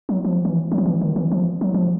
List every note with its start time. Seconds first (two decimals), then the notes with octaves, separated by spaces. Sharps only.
0.09 F#3
0.25 F3
0.45 E3
0.72 F#3
0.78 F3
0.86 E3
1.01 D#3
1.16 E3
1.32 F3
1.61 F#3
1.74 F3